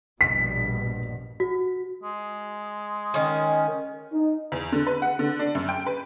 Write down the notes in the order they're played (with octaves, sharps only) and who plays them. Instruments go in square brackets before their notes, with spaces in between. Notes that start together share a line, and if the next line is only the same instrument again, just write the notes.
[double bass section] A#1 G2 B2 [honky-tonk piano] B6
[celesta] F#4
[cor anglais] G#3
[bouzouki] D#3 C#4
[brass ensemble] D#4
[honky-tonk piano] E2
D3
B4
F#5
D3
D4
F#2
G5
B4